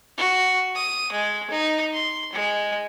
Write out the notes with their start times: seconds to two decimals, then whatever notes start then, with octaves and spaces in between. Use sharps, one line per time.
0.17 F#4
0.75 D#6
1.12 G#3
1.50 D#4
1.93 C6
2.33 G#3